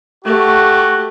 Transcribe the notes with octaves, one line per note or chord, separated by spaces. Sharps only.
A3 F#4 G4